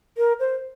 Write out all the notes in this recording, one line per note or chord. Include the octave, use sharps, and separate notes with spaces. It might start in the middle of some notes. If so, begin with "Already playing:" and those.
A#4
C5